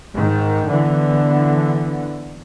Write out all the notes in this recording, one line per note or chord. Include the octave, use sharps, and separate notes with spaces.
G#2 D#3
D3 E3 B3